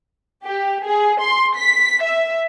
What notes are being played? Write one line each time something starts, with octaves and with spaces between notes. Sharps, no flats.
G4
G#4
C6
B6
E5